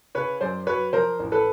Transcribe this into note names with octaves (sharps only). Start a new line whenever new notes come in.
C#3 B4 C#5
F#2 C5 D5
F#3 B4 C#5
F3 A#4 C5
A1
A4 B4